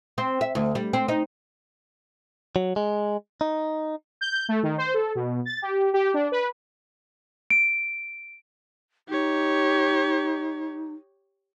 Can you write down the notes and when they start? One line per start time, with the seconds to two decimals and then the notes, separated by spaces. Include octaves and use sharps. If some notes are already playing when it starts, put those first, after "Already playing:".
0.18 C4
0.41 E5
0.55 D2
0.75 G3
0.93 C4
1.08 D#4
2.56 F#3
2.76 G#3
3.41 D#4
4.21 G6
4.49 A3
4.63 D#3
4.78 C5
4.94 A4
5.15 B2
5.45 A6
5.62 G4
5.94 G4
6.14 D4
6.32 B4
7.50 D7
9.08 D#4 G4 C#5